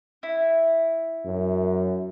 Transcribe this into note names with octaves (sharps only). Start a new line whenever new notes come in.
E4
F#2